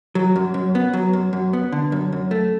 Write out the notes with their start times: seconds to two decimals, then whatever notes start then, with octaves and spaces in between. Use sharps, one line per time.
0.15 F#3
0.36 F#2
0.54 F#2
0.75 B3
0.93 F#3
1.13 F#2
1.33 F#2
1.53 B3
1.72 D3
1.92 F#2
2.13 F#2
2.31 A3